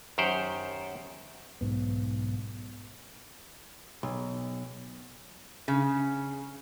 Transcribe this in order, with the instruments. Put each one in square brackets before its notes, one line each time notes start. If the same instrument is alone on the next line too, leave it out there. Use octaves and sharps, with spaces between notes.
[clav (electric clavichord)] F#2 D#3 G4 C5 F#5 G5
[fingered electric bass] B1 G#2 B3
[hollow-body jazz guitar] B1
[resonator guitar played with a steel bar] C#3